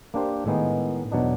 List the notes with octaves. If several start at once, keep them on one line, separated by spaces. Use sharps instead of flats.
A#3 D4 G4 C5
A2 D#3 G#3 B3 D#4
E2 B2 F#3 D4 D#4